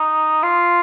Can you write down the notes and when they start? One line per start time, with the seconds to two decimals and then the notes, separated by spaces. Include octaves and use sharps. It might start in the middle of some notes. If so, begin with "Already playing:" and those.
Already playing: D#4
0.43 F4